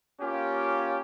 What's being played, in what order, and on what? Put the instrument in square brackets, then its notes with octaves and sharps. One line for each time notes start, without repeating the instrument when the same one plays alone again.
[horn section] A#3 C#4 F4 G4